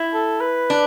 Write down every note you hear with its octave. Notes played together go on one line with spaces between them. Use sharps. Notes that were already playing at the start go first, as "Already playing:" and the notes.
Already playing: E4
A4
B4
D4